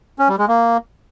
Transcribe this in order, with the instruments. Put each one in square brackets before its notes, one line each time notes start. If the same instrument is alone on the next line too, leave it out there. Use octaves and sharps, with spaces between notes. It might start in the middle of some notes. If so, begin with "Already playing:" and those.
[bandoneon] C#4
G3
G#3
A#3